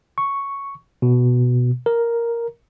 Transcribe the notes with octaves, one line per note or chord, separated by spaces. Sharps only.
C#6
B2
A#4